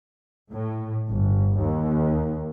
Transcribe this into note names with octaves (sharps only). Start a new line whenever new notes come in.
A2
G1
D#2